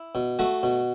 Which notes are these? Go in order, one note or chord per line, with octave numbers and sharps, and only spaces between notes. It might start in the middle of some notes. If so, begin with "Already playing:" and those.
Already playing: E4
B2
A3 F#4
B2